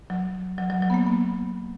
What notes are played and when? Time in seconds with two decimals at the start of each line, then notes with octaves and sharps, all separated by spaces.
0.10 F#3
0.58 F#3
0.70 F#3
0.82 F#3
0.90 B3
0.94 A#3
1.06 B3